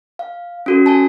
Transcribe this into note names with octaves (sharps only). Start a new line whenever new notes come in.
F5
C#4 F#4 A4
F#4 G#5 A5